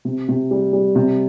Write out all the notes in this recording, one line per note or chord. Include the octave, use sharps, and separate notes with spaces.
C3
C3
G3
G3
C3